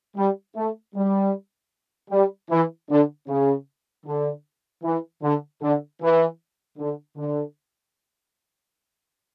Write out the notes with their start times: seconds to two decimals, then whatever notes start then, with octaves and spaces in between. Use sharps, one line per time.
0.17 G3
0.56 A3
0.95 G3
2.11 G3
2.50 E3
2.89 D3
3.28 C#3
4.05 D3
4.84 E3
5.22 D3
5.61 D3
6.01 E3
6.78 D3
7.17 D3